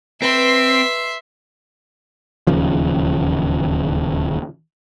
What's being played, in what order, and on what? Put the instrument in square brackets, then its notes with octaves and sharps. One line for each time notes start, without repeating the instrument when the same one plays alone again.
[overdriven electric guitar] C4 [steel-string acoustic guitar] B4 [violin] E5 C6
[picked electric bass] D1 D#2 C#3 F3